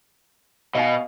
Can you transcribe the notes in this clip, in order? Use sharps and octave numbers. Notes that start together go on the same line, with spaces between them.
B2 D#5 F5 G#5